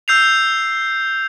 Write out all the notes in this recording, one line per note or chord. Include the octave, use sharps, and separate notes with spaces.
E6 G6 C7 F7